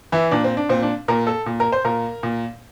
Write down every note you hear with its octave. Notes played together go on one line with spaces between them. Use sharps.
E3 E4
A#2 D4
C4
D4
A#2 C4
D4
A#2 A#4
A4
A#2
A#4
C5
A#2 A#4
A#2